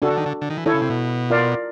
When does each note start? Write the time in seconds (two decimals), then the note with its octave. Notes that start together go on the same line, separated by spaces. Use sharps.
0.02 C#3 D4 F#4 A4
0.10 D3
0.17 D#3
0.26 D3
0.42 D3
0.50 D#3
0.57 E3
0.66 D#3 E4 A4 C#5
0.74 C#3
0.82 C3
0.90 B2
1.30 F4 A#4 D5 F5